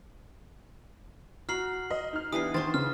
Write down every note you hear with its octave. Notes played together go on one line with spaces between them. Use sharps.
F#4 A#5 F6 C7 F#7
D#5
D#4 F6
E3 B3 D4 G4 D#6 C7
D#3 C5 D5 A5 C6 C#6 A6
C#3 F6